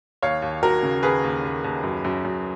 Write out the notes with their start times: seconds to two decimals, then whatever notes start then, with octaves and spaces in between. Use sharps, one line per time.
0.22 D#2 C#5 F5
0.42 D#2
0.62 D#2 F#4 A#4
0.83 C#3
1.03 D#2 G#4 B4
1.24 D#2
1.43 D#2
1.64 D#2
1.83 F#2
2.04 F#2
2.25 F#2